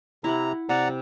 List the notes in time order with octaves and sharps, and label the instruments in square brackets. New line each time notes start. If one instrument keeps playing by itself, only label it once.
[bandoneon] C3 A#5 [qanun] E4 F#5
[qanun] C3 [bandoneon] D5 F#5 A#5